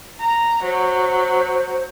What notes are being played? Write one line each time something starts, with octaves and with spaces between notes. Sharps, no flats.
A#5
F#3 C5